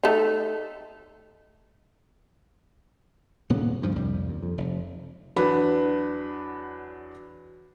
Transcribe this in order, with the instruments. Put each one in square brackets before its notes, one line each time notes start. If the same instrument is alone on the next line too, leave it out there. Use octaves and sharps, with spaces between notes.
[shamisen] A3 D#4
[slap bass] D#1 A#2 C#3 B3
D2 G2 F3
C2 F2 G3
D#2
F2
F1
[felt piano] E2 F#3 D4 B4 B5